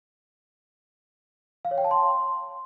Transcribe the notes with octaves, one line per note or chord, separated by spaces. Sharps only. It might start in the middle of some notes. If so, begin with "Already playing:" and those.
F5
C#5
G5
A5
C6